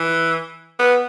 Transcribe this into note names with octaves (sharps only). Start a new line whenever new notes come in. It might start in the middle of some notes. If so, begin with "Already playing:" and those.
Already playing: E3
B3